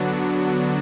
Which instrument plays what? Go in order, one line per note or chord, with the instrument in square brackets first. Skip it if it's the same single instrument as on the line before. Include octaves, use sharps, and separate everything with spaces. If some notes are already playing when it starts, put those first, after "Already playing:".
Already playing: [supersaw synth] D3 F#3 B3 D4 F#4